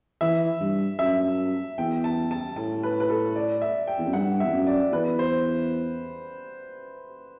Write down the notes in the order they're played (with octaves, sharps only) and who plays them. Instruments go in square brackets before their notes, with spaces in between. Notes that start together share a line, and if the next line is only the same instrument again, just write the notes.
[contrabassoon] E3 [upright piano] E5
[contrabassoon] G2
[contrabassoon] F#2 [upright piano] E5
[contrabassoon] E2 [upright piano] G5
[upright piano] A5
A5
[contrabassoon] A2 [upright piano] A5
[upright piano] B4
B4
A4
D5
E5
G5
[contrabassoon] E2
F#2
[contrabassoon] G2 [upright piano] F#5
[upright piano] E5
[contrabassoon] E2
F#2
[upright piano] D5
[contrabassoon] E2 [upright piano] B4
[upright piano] C5